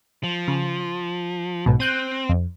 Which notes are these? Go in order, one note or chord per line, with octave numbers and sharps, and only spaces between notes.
F3
C#3
B1 G#2 B2
C4 F#6 G6 D#7
F2